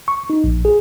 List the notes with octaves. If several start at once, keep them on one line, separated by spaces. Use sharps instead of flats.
C#6
D#4
A#1
G#4